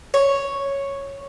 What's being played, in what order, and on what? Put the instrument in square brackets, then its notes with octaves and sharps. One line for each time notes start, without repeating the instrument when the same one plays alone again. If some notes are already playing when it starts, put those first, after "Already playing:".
[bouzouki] C#5